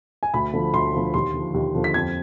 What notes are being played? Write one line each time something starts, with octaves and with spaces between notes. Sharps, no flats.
G#5
D2 B5
D3 F3
D2 C6
D3 F3
D#2 C6
D3 F3
D#2
D3 F3
B6
F2 G#6